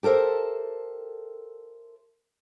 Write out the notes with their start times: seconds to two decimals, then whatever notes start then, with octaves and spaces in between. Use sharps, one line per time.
0.03 G4 A4 A#4 C5 E5